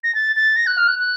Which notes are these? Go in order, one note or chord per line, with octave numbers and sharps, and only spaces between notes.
A#6
A6
A6
A#6
F#6
F6
F#6
F#6